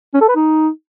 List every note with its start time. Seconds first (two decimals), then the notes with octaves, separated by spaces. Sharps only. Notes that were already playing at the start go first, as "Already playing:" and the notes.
0.14 C#4
0.21 A4
0.28 B4
0.35 D#4